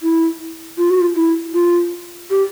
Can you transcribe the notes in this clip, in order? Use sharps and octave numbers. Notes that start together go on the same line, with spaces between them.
E4
F4
F#4
F4
E4
F4
G4